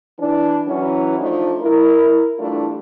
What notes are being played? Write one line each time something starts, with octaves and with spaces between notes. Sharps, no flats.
E3 D4
E3 F#3 C#4
F3 A3 D4 D#4
E4 A#4
E3 G3 A3 D4 E4 F4